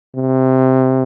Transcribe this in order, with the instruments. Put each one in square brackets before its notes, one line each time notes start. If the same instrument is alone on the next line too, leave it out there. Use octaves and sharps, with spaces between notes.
[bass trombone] C3